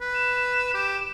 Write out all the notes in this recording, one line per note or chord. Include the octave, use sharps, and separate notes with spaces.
B4
E7
G4